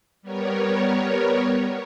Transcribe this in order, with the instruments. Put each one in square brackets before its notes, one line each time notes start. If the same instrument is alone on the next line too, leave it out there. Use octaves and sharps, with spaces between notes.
[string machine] G3 B3 A#4 C#5